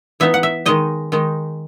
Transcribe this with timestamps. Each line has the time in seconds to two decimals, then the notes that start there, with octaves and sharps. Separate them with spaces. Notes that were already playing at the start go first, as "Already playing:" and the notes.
0.20 E3 B3 D#4 E5
0.34 F#5
0.43 E5
0.66 D#3 G#3 D#4 D#5
1.12 D#3 G#3 D#4